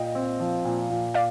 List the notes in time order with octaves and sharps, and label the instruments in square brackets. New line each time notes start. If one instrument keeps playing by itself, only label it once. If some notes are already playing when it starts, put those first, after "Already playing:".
Already playing: [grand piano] A#2 [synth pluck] D#5 G5
[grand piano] C4
F3
A#2
A#2
[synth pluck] D5 F5